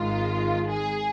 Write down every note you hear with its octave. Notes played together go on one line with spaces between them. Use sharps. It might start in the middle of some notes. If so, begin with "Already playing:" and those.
Already playing: G#1 G#2 D#3 G#3 F4
G#4